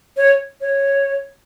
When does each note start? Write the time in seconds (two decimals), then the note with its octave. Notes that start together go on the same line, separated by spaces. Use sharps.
0.17 C#5
0.61 C#5